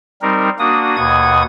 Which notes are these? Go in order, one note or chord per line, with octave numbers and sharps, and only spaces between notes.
G3 C4 D#4 A#4
A#3 D4 F#4 D#6
D#2 B2 F#5 D#6 G#6